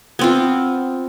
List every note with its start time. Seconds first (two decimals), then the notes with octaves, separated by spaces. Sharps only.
0.19 B3 C4 F4